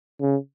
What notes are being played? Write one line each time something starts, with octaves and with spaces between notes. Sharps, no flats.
C#3